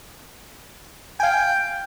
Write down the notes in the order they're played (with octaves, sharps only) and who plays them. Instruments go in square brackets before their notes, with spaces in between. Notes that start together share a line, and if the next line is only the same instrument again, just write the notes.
[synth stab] F5 G#5 [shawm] G5